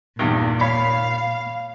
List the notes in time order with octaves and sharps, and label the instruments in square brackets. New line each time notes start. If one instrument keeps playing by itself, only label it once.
[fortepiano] E2 G2 D#3 [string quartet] A#2
[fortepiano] C#5 [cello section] F5 [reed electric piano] B5